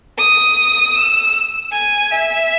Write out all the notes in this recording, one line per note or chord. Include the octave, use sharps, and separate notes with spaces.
D#6
E6
G#5
E5